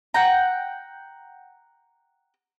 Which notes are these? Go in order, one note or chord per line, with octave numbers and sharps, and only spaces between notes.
F#5 G5 A#5